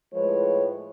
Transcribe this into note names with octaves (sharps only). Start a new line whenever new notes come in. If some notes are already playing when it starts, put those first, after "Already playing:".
A2 F3 G#3 B4 C#5